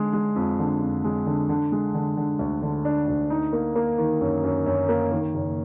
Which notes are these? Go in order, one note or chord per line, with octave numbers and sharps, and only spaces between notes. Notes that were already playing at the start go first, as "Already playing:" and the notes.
Already playing: D3 G#3
G#3
F2
D3
F2
G#3
D3
D3
G#3
D3
D3
D2
D3
D4
D2
D#4
A#3
A#3
D#3
F#2
F#2
F#2
A#3
D#3
F#1